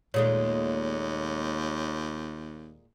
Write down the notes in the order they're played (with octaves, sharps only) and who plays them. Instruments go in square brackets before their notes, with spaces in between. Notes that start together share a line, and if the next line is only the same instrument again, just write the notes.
[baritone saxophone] D#2 [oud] A#2 G#3 A3 [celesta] C#5